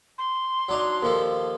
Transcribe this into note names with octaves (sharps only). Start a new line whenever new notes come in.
C6
F#3 D4 D#4
D#2 F3 A4